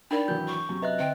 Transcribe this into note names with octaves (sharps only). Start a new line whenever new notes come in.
D4 D#4 A#4 D5 G5 B5
G#1 E3 F#3 G6
C#6
F#2 C3
B4 D#5 E5 F#6
D3 C4 G5